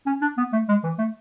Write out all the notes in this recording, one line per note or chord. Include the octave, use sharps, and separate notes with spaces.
C#4
D4
B3
A3
G#3
E3
A3